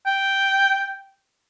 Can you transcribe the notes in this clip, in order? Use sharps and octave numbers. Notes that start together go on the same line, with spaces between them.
G5